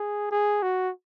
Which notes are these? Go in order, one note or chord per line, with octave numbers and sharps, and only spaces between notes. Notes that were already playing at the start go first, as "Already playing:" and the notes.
Already playing: G#4
G#4
F#4